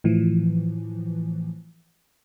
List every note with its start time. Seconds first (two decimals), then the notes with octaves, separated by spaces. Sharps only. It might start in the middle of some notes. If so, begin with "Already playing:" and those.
0.04 A2 E3 F3